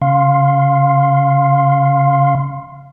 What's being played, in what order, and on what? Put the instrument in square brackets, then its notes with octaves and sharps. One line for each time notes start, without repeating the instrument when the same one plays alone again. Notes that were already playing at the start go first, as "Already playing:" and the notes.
[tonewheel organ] C#3 F5 C6